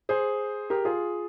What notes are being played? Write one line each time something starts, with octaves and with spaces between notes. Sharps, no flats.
G#4 C5
G4 A#4
F4 G#4